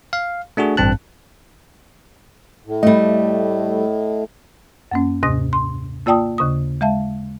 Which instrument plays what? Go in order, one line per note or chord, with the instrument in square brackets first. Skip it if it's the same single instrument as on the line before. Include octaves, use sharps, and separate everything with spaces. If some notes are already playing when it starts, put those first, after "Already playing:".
[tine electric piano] F5
A3 D4 F#4 G#4
A1 G2 C4 A5 F#6
[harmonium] A2
[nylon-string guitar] G3 A3 [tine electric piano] D#5
[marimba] F#2 A#3 C#4
D#2 G#2 C3 D#6 A#6
C6
A#3 F4 D5 G5 A5 D#6
D#2 C#3 D#6
G#3 E5 F5 A5